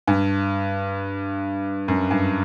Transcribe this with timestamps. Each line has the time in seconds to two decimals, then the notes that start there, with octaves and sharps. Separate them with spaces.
0.08 G2
1.88 F#2
2.11 G2